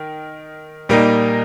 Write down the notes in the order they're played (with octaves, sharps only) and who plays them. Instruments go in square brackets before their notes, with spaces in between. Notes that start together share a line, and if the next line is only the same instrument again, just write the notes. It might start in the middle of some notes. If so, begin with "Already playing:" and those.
Already playing: [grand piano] D#3
A#2 G3 A#3 D#4